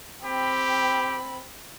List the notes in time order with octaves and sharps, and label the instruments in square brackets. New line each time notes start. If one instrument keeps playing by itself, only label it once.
[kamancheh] C4 B5 [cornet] G4